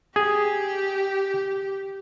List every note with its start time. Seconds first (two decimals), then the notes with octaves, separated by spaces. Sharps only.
0.16 G4 G#4